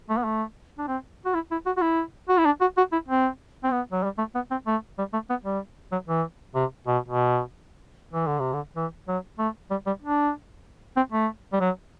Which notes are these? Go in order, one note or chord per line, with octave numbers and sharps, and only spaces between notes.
A3
B3
A3
D4
C4
F#4
E4
E4
F#4
F#4
E4
F#4
E4
D4
F#4
F#4
E4
C4
C4
B3
F#3
G3
A3
B3
C4
A3
G3
A3
B3
G3
F#3
E3
C3
B2
B2
E3
D3
C3
D3
E3
F#3
A3
G3
G3
D4
C4
A3
G3
F#3